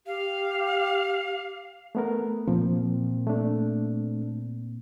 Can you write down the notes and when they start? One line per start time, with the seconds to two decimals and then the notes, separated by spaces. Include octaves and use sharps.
0.07 G4 F5
1.95 A3 B3 A#4
2.48 A#2 F3 A#3 C4
3.27 A3 D4